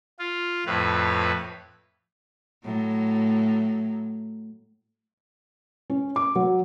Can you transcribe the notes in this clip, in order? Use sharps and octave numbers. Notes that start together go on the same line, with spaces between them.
F4
F2 A2 B4
A2 F#3
C#4
D6
F#3